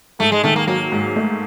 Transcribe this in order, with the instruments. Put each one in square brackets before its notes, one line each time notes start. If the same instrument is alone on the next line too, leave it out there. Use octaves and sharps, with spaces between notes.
[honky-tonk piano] G#2 [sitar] A3
[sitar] G#3
[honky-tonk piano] D#3 [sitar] A3
[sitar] A#3
[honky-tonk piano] F#3 [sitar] A#3
[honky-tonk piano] G#2
A3